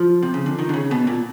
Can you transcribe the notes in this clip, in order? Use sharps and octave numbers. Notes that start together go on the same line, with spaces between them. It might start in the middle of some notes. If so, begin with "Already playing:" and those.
Already playing: F3
C3
C#3
D3
D#3
D3
C#3
B2
A#2